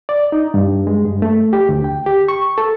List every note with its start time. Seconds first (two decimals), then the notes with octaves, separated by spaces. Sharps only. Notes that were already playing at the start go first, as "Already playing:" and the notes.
0.09 D5
0.32 D#4
0.54 G2
0.87 G#3
1.06 G2
1.22 A3
1.53 G4
1.69 D2
1.84 G5
2.06 G4
2.28 C#6
2.58 A4